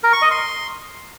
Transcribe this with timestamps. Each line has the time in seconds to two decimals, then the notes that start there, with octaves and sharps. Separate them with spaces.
0.03 A#4
0.13 C#6
0.22 D#5
0.31 C6